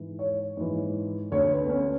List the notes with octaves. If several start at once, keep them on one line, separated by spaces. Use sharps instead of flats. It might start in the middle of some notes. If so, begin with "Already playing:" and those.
Already playing: G#2 E3
C#5
G#2 E3
D2 D3 C#5
B4
B3
C#4